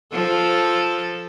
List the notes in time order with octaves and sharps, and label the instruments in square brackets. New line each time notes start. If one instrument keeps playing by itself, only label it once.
[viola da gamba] F3 A4